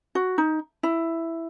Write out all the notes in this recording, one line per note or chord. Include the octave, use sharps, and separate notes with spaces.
F#4
D#4
E4